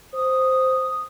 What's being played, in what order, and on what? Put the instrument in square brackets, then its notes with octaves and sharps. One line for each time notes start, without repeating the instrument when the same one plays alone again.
[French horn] C5 [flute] D#6